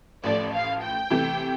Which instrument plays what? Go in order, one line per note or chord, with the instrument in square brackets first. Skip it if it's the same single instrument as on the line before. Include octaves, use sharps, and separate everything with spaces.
[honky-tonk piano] A1 A2 F3 A3 [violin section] D5
[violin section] F5
G5
[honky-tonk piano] C3 E3 A3 E4 G4